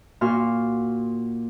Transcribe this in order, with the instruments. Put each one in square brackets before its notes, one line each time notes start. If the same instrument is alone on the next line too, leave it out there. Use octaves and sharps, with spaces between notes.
[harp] A#2 F#4 C6 F6